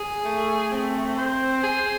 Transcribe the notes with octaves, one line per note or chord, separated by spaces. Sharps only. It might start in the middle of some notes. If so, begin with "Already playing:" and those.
Already playing: G#4
A3
C4
C5
G#4